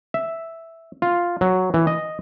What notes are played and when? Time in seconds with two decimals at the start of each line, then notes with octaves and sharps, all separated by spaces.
0.14 E5
1.02 F4
1.41 F#3
1.74 E3
1.87 D#5